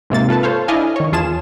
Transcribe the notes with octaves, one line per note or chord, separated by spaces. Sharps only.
G#2 C3 A#3 A6
F4 A4 B4 A5
A4 C5 C#5 F5
D4 E4 D#5 F5 G#5
D#3 C#5
E2 F4 G#4 A5 E7